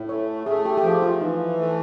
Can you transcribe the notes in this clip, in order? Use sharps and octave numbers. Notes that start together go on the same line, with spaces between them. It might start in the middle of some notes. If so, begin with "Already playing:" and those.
Already playing: A2
A3 C#5
A3 G#4
G4
G4
F3 G#4
F4
E3 D#4
A3